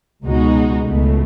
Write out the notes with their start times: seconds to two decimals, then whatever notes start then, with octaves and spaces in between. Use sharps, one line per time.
0.24 C#2 B2 G#3 D#4 F#4
0.86 C#2 B2 A3